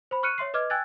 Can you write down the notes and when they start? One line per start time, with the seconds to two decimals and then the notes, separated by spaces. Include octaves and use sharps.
0.11 C5 B5
0.23 C#6 F6 F#6 C#7 D#7
0.38 C#5 E5 C6 C7
0.54 B4 D#5 D6 F6 G#6
0.70 G5 G#5 E6 F#6 G#6 A6